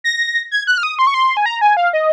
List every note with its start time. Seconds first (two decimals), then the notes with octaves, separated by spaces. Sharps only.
0.04 A#6
0.51 G#6
0.67 F#6
0.78 F6
0.83 D#6
0.99 C6
1.07 C#6
1.14 C6
1.37 G#5
1.46 A#5
1.61 G#5
1.77 F5
1.93 D#5